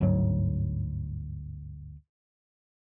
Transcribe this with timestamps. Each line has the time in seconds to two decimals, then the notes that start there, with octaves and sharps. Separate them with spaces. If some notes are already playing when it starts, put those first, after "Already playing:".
0.01 G1 D2 G#2 F#3